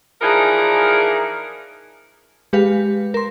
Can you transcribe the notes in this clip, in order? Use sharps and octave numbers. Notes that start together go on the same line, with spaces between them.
E3 F3 D4 D#4 G#4 A#4
G#3 G4 B4 F5
A#4 C6